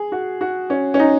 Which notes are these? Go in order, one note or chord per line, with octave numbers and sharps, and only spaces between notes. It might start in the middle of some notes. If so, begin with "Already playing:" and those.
Already playing: G#4
F#4
F#4
C#4
C#4
D#4